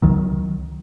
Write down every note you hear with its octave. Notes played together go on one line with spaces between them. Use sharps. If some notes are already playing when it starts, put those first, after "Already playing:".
C#2 D#3 F#3